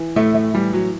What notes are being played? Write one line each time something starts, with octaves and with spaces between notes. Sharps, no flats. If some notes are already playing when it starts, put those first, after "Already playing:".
Already playing: E3
A2 A3
A3
E3 G3
F#3